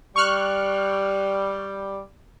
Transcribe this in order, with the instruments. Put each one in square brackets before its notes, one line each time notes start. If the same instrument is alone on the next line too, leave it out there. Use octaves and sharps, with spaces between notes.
[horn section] G3 [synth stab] C#6 F6 F#6